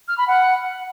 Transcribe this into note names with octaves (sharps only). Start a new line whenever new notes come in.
F6
B5
F#5